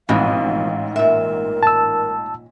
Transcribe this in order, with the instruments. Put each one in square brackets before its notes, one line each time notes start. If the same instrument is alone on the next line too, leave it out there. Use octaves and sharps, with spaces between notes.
[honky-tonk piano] A1 G#2 [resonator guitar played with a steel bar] F2 B2 [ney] F5
[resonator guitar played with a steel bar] A#2 E5 [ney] A#4
[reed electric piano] A5 E6